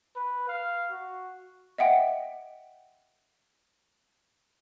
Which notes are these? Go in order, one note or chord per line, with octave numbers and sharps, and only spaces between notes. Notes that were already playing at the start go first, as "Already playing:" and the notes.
B4
F5
F#4
D#5 E5 F#5 G5